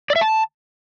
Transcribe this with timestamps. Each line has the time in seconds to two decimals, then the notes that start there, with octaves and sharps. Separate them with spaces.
0.10 D5
0.16 E5
0.21 A5